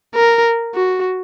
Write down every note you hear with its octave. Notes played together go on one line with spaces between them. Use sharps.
A#4
F#4